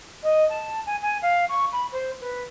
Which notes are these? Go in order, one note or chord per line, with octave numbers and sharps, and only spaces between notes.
D#5
A5
G#5
G#5
F5
C#6
B5
C5
B4